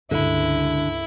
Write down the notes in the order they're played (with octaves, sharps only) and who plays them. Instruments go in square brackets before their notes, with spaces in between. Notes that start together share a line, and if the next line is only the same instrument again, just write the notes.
[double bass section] C#2 G2 [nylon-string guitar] D3 [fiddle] E4